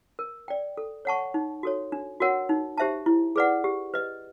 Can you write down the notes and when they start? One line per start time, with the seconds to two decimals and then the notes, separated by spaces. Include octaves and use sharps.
0.19 A#4
0.48 D5 G5
0.77 A4
1.05 C#5 F#5 A5 C#6
1.34 D#4
1.63 F#4 A4 C#5
1.92 D4
2.20 F#4 A#4 C#5 F#5
2.49 D#4
2.78 G4 C5 E5 A5
3.06 E4
3.36 G#4 B4 D5 F#5
3.64 G4
3.94 B4 D#5